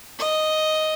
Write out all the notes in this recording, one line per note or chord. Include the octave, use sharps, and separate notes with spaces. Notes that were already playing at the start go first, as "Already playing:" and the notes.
D#5